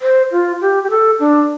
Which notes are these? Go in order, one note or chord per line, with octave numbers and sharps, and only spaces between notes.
C5
F4
G4
G4
A4
D4